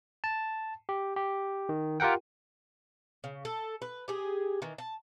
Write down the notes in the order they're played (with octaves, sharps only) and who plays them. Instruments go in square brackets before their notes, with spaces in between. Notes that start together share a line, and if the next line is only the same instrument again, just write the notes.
[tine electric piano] A5
G4
G4
D#3
F4 G4 A#4 F#5 G5
[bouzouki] C#3
A4
B4
G4 G#4
D#3 E3
A5